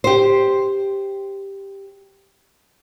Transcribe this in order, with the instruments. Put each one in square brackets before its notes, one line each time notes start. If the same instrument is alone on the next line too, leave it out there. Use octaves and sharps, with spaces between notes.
[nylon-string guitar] G4 C5